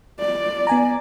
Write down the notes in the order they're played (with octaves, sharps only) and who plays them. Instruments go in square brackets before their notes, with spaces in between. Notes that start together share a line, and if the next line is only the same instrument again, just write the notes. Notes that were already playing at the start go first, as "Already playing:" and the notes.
[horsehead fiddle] D5
[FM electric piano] B3 G#5 A#5